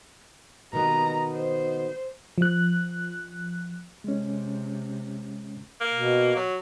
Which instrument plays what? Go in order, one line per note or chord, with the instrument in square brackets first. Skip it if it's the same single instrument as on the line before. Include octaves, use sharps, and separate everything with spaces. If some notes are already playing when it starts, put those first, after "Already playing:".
[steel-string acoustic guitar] B2 D#3 B3 [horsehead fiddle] A#5
[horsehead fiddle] C5
[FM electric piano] F3 F#6
[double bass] C3 [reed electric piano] G#3 C#4
[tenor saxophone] A#3
[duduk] B2
[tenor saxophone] F#3